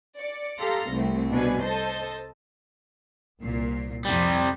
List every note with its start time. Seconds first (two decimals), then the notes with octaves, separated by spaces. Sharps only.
0.16 D5 C#7
0.59 G4 A4 F5 A#5 C6
0.90 C2 A3 C4
1.31 B2 D4 B4 G#5
1.62 A4 C5 D#5 A5 G6
3.40 C2 A#2 C7
4.05 F2 C3 G3